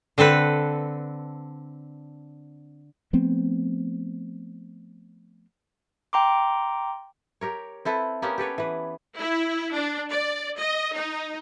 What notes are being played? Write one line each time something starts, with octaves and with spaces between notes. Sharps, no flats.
D3 C4 A4 B4
F3 A3 B3 C4
G5 A#5 C6 D6
G4 A#4 C#5
C4 E4 A4 B4
A#3 B3 C#4 G4
G4 A4 B4 C#5
E3 B4
E4
D4
D5
D#5
D#4